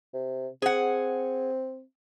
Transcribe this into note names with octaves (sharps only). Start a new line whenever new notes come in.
C3
C4 G#4 F#5